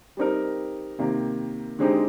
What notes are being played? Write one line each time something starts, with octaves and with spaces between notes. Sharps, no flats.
G3 C4 D#4 A#4
C3 D#3 A#3
D3 G#3 C4 D#4 G4